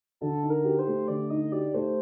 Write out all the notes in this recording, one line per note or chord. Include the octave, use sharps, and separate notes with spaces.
D3 A4
D#4
A#4
G4
C5
A3
D3 D5
D#4 D#5
G4 D5
A3 C5